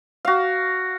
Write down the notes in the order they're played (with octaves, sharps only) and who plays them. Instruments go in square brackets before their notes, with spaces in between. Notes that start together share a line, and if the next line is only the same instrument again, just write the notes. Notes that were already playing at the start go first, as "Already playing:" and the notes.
[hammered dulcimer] F#4 F5